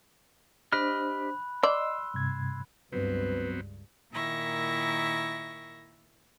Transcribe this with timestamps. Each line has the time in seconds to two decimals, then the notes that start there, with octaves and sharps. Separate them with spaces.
0.73 D4 G4 C5 D#5 B5 F6 F#6
1.63 D5 D#5 C6 E6
2.14 G2 C3 G#6
2.93 C#2 G2 F#3 B3 C4 B4
4.11 A#2 D#3 E4 E5 C#6 A#6